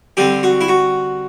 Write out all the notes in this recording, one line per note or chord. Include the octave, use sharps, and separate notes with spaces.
D3 G3 C4 G4
F#4
E4
F#4